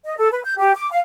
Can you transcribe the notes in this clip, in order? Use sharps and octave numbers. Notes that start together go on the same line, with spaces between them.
D#5
A4
B4
G6
G4
D6
F5